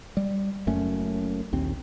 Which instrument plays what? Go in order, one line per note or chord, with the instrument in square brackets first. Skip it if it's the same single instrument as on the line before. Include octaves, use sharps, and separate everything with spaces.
[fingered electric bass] G3
F#1 F#2 A3 C#4
A#1 D#2 C4